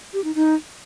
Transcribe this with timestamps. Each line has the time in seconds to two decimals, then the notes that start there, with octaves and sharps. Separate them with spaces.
0.13 G4
0.24 D#4
0.35 D#4